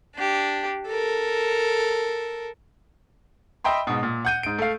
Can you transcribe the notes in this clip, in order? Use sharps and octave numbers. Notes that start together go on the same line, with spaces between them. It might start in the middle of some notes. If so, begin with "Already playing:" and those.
D4 G4
A4 A#4
D#5 E5 G5 B5 C6
G#2 B2
A#2
F#5 G6 D#7
G#2 D7
A3 F5